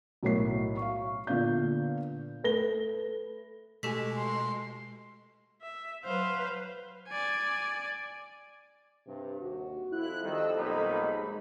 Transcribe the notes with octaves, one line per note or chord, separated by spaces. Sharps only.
B1 A2 A#4 C#5 C7
F5 C#6
A#2 D3 B3 F5 G6
A3 B4 A#6 G7
B2 G#3 A3 G4 A4 G#5 B6
C6
E5
F#3 B4 C5 F5
D5 G#5
G2 C3
D#2 F#4
F2 E4 F#6
D#3 G3 A4 D#5 E6
B1 A#3 D#4 B5
G#3